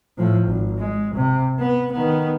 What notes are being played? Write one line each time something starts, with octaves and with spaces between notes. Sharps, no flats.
A2 F3
G#1
G#3
C3
B3
D#3 B3